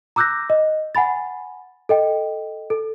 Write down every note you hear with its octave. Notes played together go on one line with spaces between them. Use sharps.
A#5 D6 E6 F#6 G6 A#6
D#5
F#5 G#5 B5 A6
A4 D#5 G5
A4